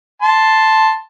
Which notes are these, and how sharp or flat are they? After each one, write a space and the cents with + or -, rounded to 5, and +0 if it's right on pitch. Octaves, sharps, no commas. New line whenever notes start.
A5 +0 C6 +0